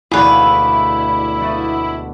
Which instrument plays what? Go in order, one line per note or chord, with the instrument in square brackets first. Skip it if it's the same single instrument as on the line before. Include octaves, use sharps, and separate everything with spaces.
[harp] E1 D2 B5 [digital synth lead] E4 [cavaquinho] G#4 B4
[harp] A3 B3